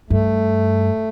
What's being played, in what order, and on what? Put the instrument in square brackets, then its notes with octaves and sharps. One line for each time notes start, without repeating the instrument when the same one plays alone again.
[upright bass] G2 [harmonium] A3